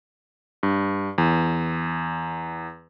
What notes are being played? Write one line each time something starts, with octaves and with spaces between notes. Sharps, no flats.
G2
E2